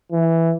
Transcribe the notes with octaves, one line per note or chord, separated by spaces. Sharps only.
E3